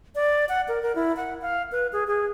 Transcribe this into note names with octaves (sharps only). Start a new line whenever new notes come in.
D5
F#5
A#4
A#4
E4
F#5
F5
B4
G#4
G#4